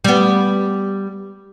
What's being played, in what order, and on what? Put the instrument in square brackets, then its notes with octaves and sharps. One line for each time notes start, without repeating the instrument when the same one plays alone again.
[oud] G3 B3